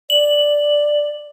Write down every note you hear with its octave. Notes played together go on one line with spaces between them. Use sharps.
D5 F#7